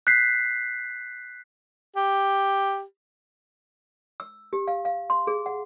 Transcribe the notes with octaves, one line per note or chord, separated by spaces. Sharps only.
F#6 G6 B6 C7
G4
E6
G4
F5
F5
C6
G#4
F#5